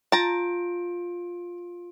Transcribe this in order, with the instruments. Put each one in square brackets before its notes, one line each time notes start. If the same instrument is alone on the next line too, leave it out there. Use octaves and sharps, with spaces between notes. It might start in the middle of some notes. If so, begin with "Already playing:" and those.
[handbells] F4 D7 [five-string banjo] A5 A#5